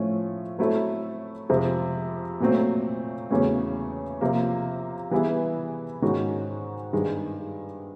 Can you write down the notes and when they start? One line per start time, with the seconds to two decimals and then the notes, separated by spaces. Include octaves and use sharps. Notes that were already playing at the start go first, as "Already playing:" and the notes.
Already playing: A2 F3 A3 C#4
0.59 F#3 A3 C4 E4 A4
1.49 F2 C3 F3 G#3
2.40 A#2 F#3 A3 C4
3.31 E2 C#3 F#3 A3 C#4
4.21 C3 F3 A#3
5.11 E3 G3 B3 E4 G#4
6.02 G#2 D#3 G#3 C#4 F#4
6.93 G2 D#3 G#3